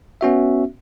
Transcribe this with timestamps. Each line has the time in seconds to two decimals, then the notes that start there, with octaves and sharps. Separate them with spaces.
0.21 B3 C#4 F#4 E5